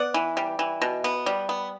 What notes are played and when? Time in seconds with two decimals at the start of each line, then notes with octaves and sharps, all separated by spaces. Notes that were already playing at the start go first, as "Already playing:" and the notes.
Already playing: B3 D5 F#5
0.14 E3
0.37 G3
0.59 E3
0.82 B2
1.04 B3
1.26 G3
1.49 B3